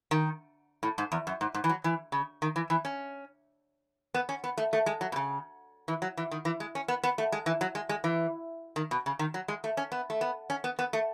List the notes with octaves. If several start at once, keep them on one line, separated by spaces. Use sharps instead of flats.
D#3
A2
G#2
E2
F#2
G#2
G#2
E3
F#3
E3
C#3
D#3
E3
E3
C#4
B3
C#4
B3
A3
A3
G#3
F#3
B2
C#3
E3
F#3
E3
D#3
E3
G#3
C#4
B3
B3
A3
G#3
E3
F#3
G#3
G#3
E3
D#3
B2
C#3
D#3
F#3
G#3
A3
C#4
B3
A3
B3
C#4
B3
B3
A3